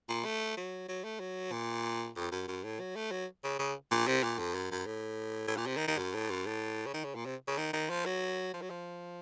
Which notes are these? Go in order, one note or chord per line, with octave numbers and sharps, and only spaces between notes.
A#2
A3
F#3
F#3
A3
F#3
A#2
F2
F#2
F#2
A2
F#3
A3
F#3
C#3
C#3
A#2
C3
A#2
F2
F#2
F#2
A2
A2
A#2
C3
D#3
D#3
F#2
A2
F#2
A2
C#3
D#3
C#3
A#2
C3
C#3
D#3
D#3
F3
F#3
F3
F#3
F3